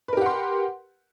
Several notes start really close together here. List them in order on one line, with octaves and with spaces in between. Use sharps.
B4 A#4 G4 F#5 C6